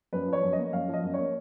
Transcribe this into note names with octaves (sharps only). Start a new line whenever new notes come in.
F#2 B4
F3 C#5
F#2
D#5
A#3
F#2 F5
F3
D#5
F#2
A#3 C#5